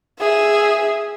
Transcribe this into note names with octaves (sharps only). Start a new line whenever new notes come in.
G#4 E5